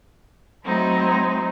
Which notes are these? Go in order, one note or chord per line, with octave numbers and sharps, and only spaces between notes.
F#3 A3 C4 D#4 E4